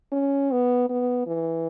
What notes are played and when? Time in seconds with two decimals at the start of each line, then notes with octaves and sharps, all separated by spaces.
0.12 C#4
0.51 B3
0.89 B3
1.27 E3